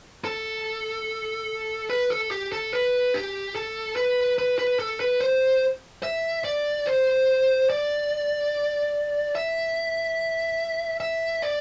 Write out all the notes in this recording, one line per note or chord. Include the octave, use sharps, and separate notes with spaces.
A4
B4
A4
G4
A4
B4
G4
A4
B4
B4
B4
A4
B4
C5
E5
D5
C5
D5
E5
E5
D5